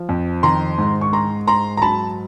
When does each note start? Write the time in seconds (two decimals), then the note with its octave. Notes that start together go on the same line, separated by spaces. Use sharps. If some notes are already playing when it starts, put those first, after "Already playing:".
Already playing: F3
0.09 F2
0.43 D#3 A#5 C6
0.78 G#2
1.01 C#6
1.13 G#3 A#5 C6
1.48 G#2 A#5 C6
1.77 A#5
1.82 F#3 A5 B5